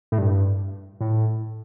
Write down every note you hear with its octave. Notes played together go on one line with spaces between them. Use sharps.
A2
G2
A2